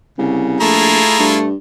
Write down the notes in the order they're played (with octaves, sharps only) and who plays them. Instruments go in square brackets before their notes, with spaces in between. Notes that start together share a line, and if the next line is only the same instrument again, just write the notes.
[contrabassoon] C2 [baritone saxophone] C#3
[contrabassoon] A#1 [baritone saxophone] A3 [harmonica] E4 F4 G#4 [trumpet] A#5
[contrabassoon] G2 [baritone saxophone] A3